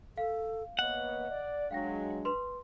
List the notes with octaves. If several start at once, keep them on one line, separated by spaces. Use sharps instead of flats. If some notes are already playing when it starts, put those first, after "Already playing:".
A4 F5
A#3 B3 C#5 D#5 F#5
D5
F#3 G#3 D4 F5 G5 A#6
B4 C6